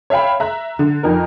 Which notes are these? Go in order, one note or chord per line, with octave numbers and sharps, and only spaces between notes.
C#5 E5 F5 G5 B5
E5 A#5 F#6
D3
F2 D#4 A#4